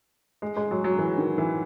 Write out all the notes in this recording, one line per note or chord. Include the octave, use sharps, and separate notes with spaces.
G#3
G#3
F#3
F#3
E3
D#3
E3